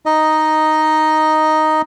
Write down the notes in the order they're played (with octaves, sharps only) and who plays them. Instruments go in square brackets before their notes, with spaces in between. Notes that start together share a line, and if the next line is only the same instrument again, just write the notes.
[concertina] D#4 D#5